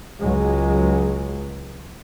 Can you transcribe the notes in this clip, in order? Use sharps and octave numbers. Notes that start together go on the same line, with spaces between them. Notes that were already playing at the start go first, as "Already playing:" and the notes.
C#2 F#3 G#3